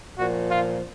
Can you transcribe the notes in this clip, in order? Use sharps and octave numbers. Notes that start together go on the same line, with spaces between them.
A#2 F3 F#4
F4